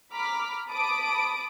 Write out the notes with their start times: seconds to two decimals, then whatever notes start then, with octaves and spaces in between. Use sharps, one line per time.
0.13 A#5 B5 D6 F6 B6
0.69 A5 B5 D6 D#6 D7